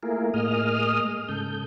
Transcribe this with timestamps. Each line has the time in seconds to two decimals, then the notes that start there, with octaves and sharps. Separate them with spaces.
0.03 A3 A#3 E4 F4 G#4 A#4
0.34 A2 A#3 G#4 D#5 D#6 F6
1.01 G#3
1.28 G#2 C#3 A4 G6